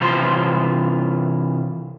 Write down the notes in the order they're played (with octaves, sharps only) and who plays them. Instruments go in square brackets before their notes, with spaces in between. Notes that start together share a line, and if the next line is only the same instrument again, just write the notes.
[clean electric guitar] C3 E3 F4 C5 C6